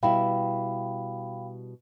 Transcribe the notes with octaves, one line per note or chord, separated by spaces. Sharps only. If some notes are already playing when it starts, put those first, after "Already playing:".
B2 G3 E4 F5 G5 B5